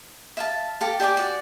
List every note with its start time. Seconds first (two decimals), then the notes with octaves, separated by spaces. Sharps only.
0.37 E5 F5 A5
0.81 G4 A4 F5
1.00 G4 D5 G#5 D6
1.17 F#4 D5